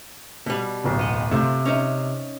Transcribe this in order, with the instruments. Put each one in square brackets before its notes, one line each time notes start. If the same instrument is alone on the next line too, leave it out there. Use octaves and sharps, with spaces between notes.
[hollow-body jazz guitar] B2 G3
[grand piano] D1 B1
[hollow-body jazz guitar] B3 D#5
[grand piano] C3 [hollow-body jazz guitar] A3 F4 C5
[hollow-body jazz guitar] C#4 D#4 E5